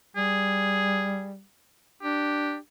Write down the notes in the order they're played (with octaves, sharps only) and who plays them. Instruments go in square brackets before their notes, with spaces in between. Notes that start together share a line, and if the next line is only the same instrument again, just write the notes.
[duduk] G3 [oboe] G#4
[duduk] D4 [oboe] G4